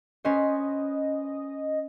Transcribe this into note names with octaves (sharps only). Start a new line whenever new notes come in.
C#4 B4 C5 D#5